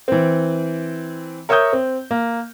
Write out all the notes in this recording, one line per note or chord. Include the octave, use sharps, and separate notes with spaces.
E3 C4
A#4 C#5 E5 C#6 D#6 G6
C4
A#3